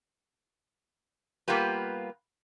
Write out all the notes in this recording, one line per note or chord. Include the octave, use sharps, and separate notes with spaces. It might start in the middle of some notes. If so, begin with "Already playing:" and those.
G3 A#3 B3 F4 G4 B4